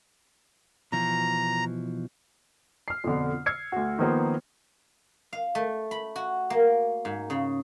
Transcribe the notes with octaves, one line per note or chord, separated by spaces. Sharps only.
B2 E3 F3 A#5
F6 C7
F2 B2 D3
E6 F6 G#6 C7 C#7
D2 F#4
D#3 F3 A#3 B3 A#4 C5
F5
A3
B5
F#4
A#3
G#2
C#3